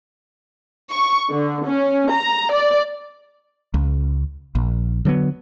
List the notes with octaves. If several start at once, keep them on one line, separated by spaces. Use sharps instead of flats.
C#6
D3
C#4
A#5
D5
C#2
A#1
D3 F#3 A3 B3